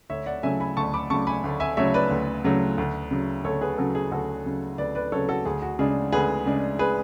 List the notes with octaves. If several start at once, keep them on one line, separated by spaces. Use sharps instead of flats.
D2 C#5 E5
D5 F#5
C#3 F#3 A3 E5 G#5
G#5 B5
D2 A5 C#6
B5 D6
C#3 F#3 A3 A5 C#6
G#5 B5
D2
E5 G#5
C#3 F#3 A3 C#5 E5
B4 D5
D2
C#3 F#3 A3
D2
C#3 F#3
D2 A4 C#5
G#4 B4
C#3 F#3 F#4 A4
G#4
D2 F#4 A4
C#3 F#3
D2 B4 D5
B4 D5
C#3 F#3 A4 C#5
F#4 A4
D2 G#4
F#4
C#3 G#3 D4 G#4
D2 G#4 B4
C#3 G#3 D4
G#4 B4